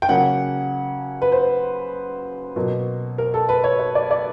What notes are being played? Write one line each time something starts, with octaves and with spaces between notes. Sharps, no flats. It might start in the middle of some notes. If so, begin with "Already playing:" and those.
G5
C#3 F#3 A#3 C#4 F#5
B4
C5
B2 F#3 A#3
A#4
A4
B4
C#5
C#5
D5
D5